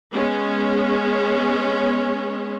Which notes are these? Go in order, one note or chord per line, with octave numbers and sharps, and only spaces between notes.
G#3 B3 C#4